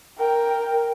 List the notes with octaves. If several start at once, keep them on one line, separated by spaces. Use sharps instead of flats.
A#4 G5